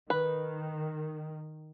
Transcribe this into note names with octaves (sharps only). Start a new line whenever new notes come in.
D#3 B4